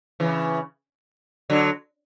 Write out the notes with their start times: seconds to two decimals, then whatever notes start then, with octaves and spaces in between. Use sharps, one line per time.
0.20 C#3 E3
1.50 D3 F#3